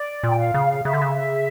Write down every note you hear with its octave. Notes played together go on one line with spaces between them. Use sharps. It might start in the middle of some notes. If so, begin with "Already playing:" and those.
Already playing: D5
A#2 G5
F5
C#3
C#3 E5
D3
C#3